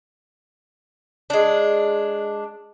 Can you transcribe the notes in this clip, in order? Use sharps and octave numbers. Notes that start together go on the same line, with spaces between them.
G#3 D4